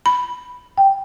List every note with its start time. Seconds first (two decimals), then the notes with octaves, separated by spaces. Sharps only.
0.06 B5
0.78 G5